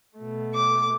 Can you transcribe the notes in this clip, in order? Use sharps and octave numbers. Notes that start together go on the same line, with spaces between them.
B2 A3
D6